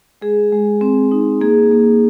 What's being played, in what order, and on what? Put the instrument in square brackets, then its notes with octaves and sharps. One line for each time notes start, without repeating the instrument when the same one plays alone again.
[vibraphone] G#3 G#4
G#3
C4
D#4
A#3 G#4
A#3